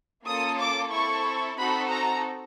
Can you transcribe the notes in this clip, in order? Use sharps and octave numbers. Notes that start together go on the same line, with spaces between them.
A#3 C#4 F4 A4 D#6
D6
C4 E4 A4 C#6
C4 D#4 F#4 A4 B5
A#5